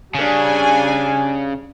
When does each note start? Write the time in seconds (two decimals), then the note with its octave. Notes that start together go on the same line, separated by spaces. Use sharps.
0.14 C#3 G3 D4 G#5